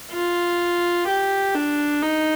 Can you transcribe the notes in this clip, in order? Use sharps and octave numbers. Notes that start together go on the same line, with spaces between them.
F4
G4
D4
D#4